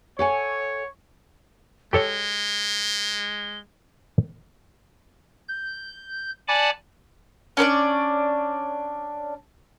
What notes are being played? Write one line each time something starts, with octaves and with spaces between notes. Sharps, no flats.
A4 C#5 F#5 G#5
G#3 G4 A4 C#5 G7
G6
D5 F#5 G#5 A5 B5 D6
C#4 D4 B4 D5